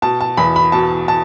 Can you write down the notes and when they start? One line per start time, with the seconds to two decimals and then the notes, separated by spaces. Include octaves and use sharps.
0.02 B2 A5
0.21 A5
0.37 E2 B5
0.56 B5
0.72 B2 A5
1.08 A5